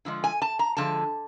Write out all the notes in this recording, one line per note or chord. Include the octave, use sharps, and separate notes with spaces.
D3 F3 G#3
G#5
A5
A#5
D3 F3 G#3 A5